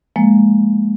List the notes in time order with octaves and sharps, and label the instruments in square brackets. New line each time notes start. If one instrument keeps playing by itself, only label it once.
[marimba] F3 G#3 A#3